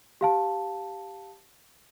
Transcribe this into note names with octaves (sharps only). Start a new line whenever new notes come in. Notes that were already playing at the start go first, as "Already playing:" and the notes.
G4 F5 A5